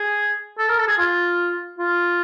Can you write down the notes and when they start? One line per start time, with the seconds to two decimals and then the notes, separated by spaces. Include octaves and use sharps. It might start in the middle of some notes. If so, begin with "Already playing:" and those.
Already playing: G#4
0.58 A4
0.68 A#4
0.78 A4
0.88 G#4
0.98 F4
1.78 F4